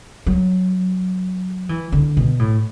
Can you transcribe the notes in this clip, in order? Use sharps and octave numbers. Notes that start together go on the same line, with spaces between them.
F#3
E3
D3
B2
A2